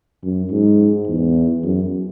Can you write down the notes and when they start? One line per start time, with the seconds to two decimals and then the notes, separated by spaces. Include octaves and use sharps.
0.23 F#2
0.50 G#2
1.07 E2
1.63 F#2